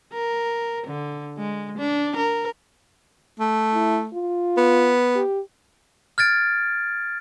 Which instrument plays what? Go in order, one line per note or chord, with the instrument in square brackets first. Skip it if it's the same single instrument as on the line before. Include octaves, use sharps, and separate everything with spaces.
[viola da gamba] A#4
D3
G#3
D4
A#4
[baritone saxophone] A3
[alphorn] E4
F4
[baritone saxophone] B3
[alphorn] G4
[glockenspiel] F6 G#6 A6 D7